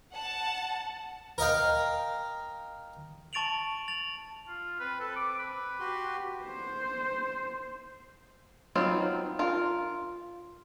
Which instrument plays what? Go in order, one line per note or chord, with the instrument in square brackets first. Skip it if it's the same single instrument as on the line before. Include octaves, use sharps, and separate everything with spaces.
[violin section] F#5 A5
[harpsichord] A#4 D#5 F5 G5
[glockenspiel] A5 C#6 A6 D7 F7 F#7
A6 F7 F#7
[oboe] F4
[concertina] C4 [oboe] B4
[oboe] A4
D6
B4
[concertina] F#4 G4 C6
[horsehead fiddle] C5
[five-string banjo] F#3 B3 C4 D#4 F4
F4 A#4